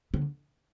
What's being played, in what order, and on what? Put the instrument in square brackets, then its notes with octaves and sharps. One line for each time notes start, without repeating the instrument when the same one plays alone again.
[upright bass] D3